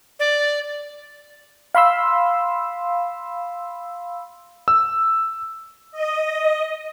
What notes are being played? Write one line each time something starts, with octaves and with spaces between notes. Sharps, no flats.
D5
F5 B5 C6 E6
E6
D#5